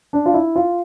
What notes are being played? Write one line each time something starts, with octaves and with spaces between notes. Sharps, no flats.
D4
F4
E4
F4